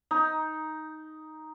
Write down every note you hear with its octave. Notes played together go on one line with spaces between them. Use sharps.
D#4